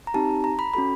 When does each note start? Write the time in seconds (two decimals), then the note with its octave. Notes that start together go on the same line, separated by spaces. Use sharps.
0.07 A#5
0.14 C4 D#4 G4 A5
0.44 A#5
0.59 B5
0.73 C#4 F#4 A4 B5